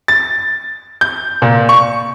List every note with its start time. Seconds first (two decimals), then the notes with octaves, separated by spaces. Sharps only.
0.08 A6
1.01 G6
1.42 A#2
1.69 C#6